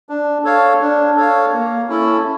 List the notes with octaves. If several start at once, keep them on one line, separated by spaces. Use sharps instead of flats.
D4
A4 C#5 F5
D4
A4 C#5 F5
A#3
C#4 E4 A4